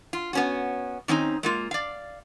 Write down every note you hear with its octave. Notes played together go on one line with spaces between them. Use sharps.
F4
B3 C#4 F#4
D#3 C4 C#4 D#4
G#3 A#3 F4
D5 F5